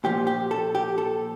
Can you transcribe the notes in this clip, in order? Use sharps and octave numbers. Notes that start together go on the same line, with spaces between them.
A#2 F3 G4
G4
A4
G4
A4